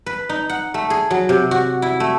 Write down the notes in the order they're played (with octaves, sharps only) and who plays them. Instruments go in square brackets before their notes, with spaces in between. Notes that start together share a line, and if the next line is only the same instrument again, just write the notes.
[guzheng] B4
D#4
F#5
A3
G#4
F#3
C3
F#4
E4
A3